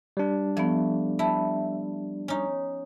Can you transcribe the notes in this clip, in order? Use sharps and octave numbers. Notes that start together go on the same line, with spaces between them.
G3 D4
F3 A3 B3
E4 E5 A5
C#4 D#4